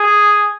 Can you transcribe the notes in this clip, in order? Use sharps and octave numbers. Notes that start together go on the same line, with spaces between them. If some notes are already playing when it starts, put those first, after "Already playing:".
Already playing: G#4